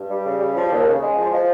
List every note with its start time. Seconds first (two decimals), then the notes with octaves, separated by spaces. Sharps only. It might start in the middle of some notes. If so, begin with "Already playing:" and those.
Already playing: G2
0.10 G3
0.24 C#3
0.41 G3
0.55 F3
0.71 D#2
0.87 C#3
1.02 G#3
1.17 F3
1.32 F3